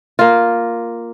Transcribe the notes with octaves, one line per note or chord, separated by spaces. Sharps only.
A#3 F4